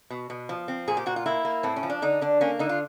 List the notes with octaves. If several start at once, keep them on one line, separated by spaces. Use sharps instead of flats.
B2
B2
F3
C4
A#2 G#4
G4
A#2 F#4
F4
A#3 E4
A#3
A2 C4
C#4
F3
D4
D3 D#4
D3 D4
A#3 C#4
D3 D#4
F4